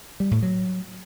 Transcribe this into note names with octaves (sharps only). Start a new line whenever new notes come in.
G3
A2
F#3